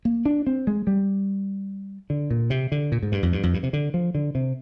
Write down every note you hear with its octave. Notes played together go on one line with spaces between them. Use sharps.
A#3
D4
C4
G#3
G3
D3
A#2
C3
D3
A#2
G#2
G2
F2
G2
F2
G2
C3
D3
F3
D3
C3